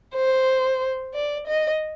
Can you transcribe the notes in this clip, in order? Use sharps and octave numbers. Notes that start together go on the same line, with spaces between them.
C5
D5
D#5